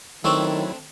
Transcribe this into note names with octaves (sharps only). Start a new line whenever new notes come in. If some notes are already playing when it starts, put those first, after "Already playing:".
D#3 F#3 A3 C4 D4 E4 C#6 E6